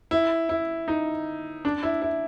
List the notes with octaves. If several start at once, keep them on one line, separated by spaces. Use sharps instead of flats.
E4
E4
D#4
D4
E4
E4